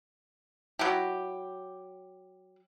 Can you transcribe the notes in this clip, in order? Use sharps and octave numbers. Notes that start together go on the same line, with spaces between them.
F#3 E4 G4